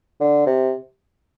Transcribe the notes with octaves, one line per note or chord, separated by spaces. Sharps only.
D3
C3